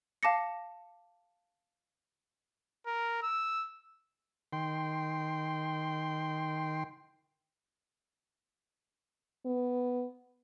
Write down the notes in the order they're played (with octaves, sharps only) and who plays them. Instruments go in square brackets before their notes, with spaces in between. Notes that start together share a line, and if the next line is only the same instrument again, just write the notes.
[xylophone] F5 A5 D6 A#6 C#7
[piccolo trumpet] A#4
E6
[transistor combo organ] D#3 G5 C6
[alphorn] B3